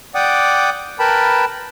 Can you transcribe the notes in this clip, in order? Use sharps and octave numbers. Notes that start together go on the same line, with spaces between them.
D5 F#5 G5 D6 D#6
A#4 B4 G5 A5 B5